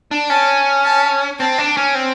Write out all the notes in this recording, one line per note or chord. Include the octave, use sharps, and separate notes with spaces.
D4
C#4 A5
A5
C4 A5
D4
C#4
C4